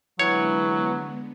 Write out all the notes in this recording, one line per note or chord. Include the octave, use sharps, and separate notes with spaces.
D3 E3 F#3 G#3 B3 C#5